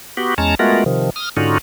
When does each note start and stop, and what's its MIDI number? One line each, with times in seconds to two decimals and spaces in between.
0.17 0.34 59
0.17 0.34 66
0.17 0.34 67
0.38 0.55 40
0.38 0.55 56
0.38 0.55 61
0.38 0.55 81
0.38 0.55 82
0.59 0.84 56
0.59 0.84 57
0.59 0.84 59
0.59 0.84 65
0.59 0.84 66
0.59 0.84 70
0.86 1.10 48
0.86 1.10 51
0.86 1.10 53
1.16 1.29 87
1.16 1.29 89
1.37 1.58 44
1.37 1.58 50
1.37 1.58 61
1.37 1.58 63
1.37 1.58 65
1.37 1.58 66